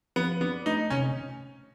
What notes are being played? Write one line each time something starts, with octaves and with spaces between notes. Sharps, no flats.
F3 B3
B3 D4
A3 D#4
C3 C#4